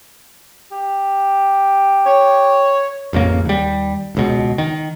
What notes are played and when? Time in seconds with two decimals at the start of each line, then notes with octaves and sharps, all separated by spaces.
0.72 G4
2.06 C#5
3.13 A1 F2 C#3 A#3
3.45 D#2 G3
4.15 D#1 C#2 B2
4.58 D#3